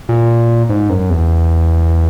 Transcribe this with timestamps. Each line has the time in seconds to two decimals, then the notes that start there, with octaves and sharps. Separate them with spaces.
0.09 A#2
0.69 G#2
0.90 F#2
1.10 E2